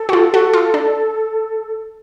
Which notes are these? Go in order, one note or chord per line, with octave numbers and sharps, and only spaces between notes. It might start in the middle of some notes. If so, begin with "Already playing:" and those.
Already playing: A4
F#4
F4
F#4
F4
D4